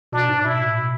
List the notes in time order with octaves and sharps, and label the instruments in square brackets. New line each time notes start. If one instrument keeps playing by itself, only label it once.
[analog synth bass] B2 [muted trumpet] D4
[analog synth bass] G#2
[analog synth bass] B2 [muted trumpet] E4
[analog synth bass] A2
B2